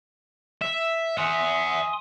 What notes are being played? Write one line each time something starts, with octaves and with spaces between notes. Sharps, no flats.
E5
E5 F#5 G#5 C6 D#6